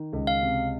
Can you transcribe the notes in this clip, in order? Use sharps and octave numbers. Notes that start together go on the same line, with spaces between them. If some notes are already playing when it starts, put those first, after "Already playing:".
Already playing: D#3
C#2
F5
C3